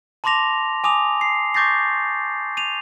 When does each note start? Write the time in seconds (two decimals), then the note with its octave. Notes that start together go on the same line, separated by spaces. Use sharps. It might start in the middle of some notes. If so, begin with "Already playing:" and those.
0.24 A5 B5 C6 D6 A#6 F7
0.84 G#5 D6 D#6 F7
1.21 C7
1.54 C#6 D6 G6 A6 A#6 C7
2.57 D#7 F7